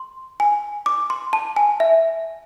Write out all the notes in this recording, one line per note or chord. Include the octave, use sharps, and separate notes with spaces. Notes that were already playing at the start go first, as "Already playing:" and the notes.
Already playing: C6
G#5
D6
C6
A5
G#5
E5